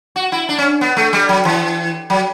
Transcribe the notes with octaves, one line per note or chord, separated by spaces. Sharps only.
F#4
E4
D4
C#4
B3
A3
G3
F#3
E3
F#3